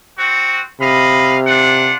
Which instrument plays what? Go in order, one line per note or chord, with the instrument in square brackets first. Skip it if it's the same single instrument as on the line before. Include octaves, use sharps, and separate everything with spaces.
[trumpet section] C4 F#4
[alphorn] C3 [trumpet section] D#5 F5 B5
[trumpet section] D4 F4 F#5